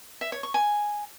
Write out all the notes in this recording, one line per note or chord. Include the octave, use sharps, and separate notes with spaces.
E5
C#5
C#6
G#5